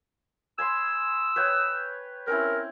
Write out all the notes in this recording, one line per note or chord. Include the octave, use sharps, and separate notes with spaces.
G#5 B5 C6 E6
B4 C#5 G5
C4 C#4 E4 A#4